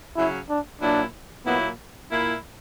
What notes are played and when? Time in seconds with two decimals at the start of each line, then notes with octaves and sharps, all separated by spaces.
0.17 C#3 F#3 C#4 E4
0.50 D4
0.81 A#2 F#3 A#3 D4 E4
1.46 A#2 F#3 A#3 B3 E4
2.12 A#2 A#3 E4